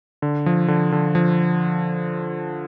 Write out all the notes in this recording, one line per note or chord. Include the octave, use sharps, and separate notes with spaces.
D3
F3
D3
D3
F3